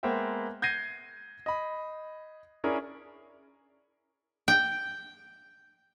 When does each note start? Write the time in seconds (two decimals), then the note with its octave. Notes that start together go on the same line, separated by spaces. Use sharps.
0.03 G#3 A#3 B3 C5 E5 G5
0.62 G6 G#6 A#6 C7 D#7
1.46 D#5 B5
2.64 C#4 D4 E4 G#4 A#4
4.48 G5